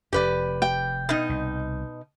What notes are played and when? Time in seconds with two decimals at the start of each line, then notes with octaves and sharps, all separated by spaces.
0.13 F1 F2 G4 B4 D5
0.62 G5
1.09 B2 D#4
1.29 C2